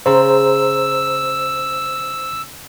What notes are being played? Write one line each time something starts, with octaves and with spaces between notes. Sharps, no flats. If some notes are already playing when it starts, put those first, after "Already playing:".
C#3 C5 A#5 C6 E6